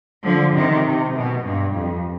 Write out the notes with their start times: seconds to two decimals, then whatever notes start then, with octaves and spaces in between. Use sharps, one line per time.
0.24 D3 F3
0.55 C3 D#3
0.84 C3
1.14 B2
1.44 G2
1.74 F2